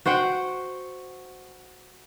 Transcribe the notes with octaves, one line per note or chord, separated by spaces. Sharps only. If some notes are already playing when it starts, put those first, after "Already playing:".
F#4 C5 F#5 G5